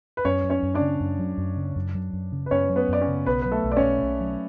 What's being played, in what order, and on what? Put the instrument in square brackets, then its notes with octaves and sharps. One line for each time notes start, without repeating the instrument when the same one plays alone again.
[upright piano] B4
[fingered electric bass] F#2 [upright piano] C#4 C#5
[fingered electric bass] F#3
[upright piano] C#4 C#5
[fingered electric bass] F#2
[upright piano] D4 D5
[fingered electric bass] C#3
F#2
F#3
F#2
C#3
F#2
F#3
F#2
C#3
[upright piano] B4
[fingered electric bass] F#2 [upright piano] C#4 C#5
[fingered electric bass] F#3
[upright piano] B3 B4
[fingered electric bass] F#2 [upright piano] D5
[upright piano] C#4 C#5
[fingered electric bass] C#3
[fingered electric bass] B1 [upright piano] B3 B4
[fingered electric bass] F#3 [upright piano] B4
[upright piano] A3 A4
[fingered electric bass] B1
[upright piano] D5
C#4 C#5
[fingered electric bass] B2
B1
F#3